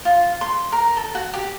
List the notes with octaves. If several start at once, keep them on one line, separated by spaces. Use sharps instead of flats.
F4
C6
A#4
A4
F#4
G4